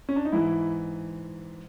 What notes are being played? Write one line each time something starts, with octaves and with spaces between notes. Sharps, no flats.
C#4
D4
D#4
G#2 E3 E4